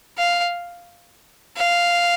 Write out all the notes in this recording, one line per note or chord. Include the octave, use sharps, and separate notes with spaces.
F5
F5